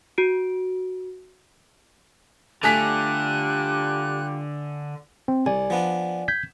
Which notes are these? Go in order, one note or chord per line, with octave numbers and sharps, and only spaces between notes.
F#4 D7
D3 G3 A3 F4 G4 G#5 F#6 B6
C4
C2 D5 G#5
F3 B3 D4
G6 G#6 B6